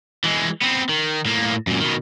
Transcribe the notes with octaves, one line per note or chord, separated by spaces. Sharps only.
E3 G#3
B3 C4
D#3
A2 A#3
F#2 A#2
B2 D#3